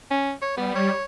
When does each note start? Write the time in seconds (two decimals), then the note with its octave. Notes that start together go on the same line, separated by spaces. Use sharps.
0.11 C#4
0.42 C#5
0.57 G3 B3
0.75 C#5